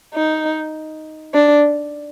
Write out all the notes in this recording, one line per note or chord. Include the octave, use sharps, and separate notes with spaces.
D#4
D4